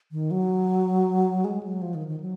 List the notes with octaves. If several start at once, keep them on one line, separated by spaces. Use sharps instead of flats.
D#3
F#3
G#3
F#3
F3
D#3
D#3
F#3